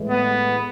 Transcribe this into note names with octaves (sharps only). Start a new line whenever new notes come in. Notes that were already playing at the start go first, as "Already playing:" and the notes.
Already playing: A2 E3 G#3
B3